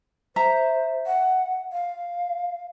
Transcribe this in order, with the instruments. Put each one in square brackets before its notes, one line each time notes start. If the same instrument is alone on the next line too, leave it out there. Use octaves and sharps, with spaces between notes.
[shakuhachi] C5 [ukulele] E5 A#5
[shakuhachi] F#5
F5